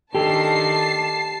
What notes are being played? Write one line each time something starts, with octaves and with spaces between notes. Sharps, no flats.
D#3 A3 D4 G4 A4 A5 C7